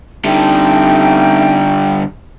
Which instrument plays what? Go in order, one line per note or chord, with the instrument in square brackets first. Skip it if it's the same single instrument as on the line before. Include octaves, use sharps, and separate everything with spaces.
[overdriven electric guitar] D3 G3 [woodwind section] A3 C4 D#4 [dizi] G5